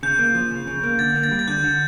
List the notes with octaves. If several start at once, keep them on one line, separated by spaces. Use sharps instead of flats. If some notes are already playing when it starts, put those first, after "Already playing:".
C#3 G6
A#3
F3
C#3
C#3
A#3
D3 A6
A#3
A6
G3
A6
D3 G6
D3